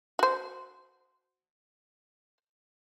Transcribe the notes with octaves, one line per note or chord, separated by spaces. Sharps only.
F#4 C5